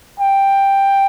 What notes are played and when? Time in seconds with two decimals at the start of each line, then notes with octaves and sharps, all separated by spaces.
0.20 G5